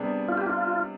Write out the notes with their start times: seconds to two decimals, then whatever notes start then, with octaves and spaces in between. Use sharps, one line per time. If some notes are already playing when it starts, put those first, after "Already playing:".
Already playing: C3 G3 B3 D4 G#4
0.28 F4
0.37 G4
0.46 F4